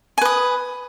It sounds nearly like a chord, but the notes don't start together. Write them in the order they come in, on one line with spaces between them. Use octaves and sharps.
G#5 B4 D#6